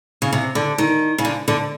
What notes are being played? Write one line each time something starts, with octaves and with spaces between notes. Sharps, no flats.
C#3
C3
D3
D#3
C#3
D3
D3